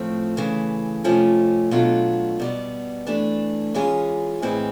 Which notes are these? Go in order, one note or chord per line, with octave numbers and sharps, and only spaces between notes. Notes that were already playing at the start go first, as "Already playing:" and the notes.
Already playing: A2 F3 A3 C4
C#3 E3 A3
F2 C3 F3 A3 C#4
B2 F#3 A3 D4 F4
B2 G3 B3
E3 A3 D4
E3 G#3 C#4 F4 G#4
A2 E3 G#3 C4